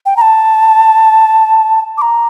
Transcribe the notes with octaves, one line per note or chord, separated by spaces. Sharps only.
G5
A#5
A5
D6
A#5